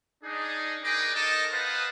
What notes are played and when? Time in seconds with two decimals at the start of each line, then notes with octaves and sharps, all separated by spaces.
0.24 D4 D#4 G#4
0.83 G#4 A#4 B4 D5 D#5 G5
1.14 D#4 A4 A#4 D#5 A5
1.51 B4 C5 D#5 F5 F#5 A5